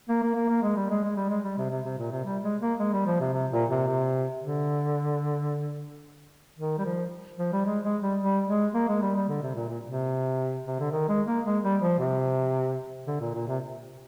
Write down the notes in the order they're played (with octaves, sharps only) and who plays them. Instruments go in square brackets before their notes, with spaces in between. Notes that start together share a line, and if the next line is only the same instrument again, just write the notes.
[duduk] A#3
A#3
A#3
A#3
G#3
G3
G#3
G#3
G3
G#3
G3
C3
C3
C3
A#2
C3
G3
G#3
A#3
G#3
G3
F3
C3
C3
A#2
C3
C3
D3
D#3
G3
F3
F3
G3
G#3
G#3
G3
G3
G#3
A#3
G#3
G3
G3
D3
C3
A#2
A#2
C3
C3
D3
D#3
G#3
A#3
G#3
G3
F3
C3
D3
A#2
A#2
C3